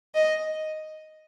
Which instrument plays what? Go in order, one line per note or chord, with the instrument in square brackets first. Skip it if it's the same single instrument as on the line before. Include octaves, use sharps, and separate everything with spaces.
[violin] D#5